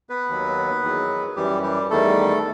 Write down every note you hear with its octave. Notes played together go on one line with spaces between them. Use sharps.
B3 B4
D#2 D#3 F#3
E2 D#3 F#3
F#2 E3 G3 G4
G3 G4
E2 D#3 G3 A3 A4